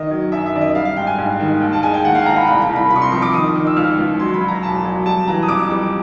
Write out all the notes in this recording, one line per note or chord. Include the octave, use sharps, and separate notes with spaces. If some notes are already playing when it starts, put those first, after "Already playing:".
Already playing: D#3 D#5
F#3
F#2 E5
E5
D#3 D5
D#5
G3 F5
F5
G#2 G5
G#5
G#2
D#3
D#2
A5
G#3 G#5
G5
D#2 F#5
F5
D#2 A#5
B5
C2 B5
B5
C2
B5
C3 B5
C#6
C6
F3 C#6
D6
D#3 D#6
D#3
E6
C#2 F6
C#2
F#3 C6
B5
F#3
A#5
E1 A5
F#3
G3 A5
E3 A#5
D#6
F2 D6
G3